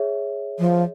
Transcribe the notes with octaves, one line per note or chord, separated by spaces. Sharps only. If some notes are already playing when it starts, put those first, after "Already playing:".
Already playing: G#4 C#5 E5
F3